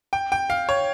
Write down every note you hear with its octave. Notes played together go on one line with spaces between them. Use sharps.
G5
G5
F5
C#5